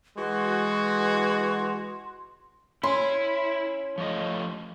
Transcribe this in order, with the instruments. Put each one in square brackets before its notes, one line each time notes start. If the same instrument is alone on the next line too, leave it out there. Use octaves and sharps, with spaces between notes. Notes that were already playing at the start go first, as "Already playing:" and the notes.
[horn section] E3 G#3 F#4 [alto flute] C6
[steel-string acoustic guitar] C#4 [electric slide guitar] E4 [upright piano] C6
[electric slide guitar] F3 A3 D#5